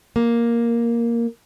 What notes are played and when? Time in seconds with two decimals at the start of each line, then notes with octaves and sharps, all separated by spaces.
0.16 A#3